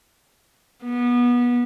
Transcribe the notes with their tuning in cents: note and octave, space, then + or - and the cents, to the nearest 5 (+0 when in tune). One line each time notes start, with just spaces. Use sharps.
B3 -25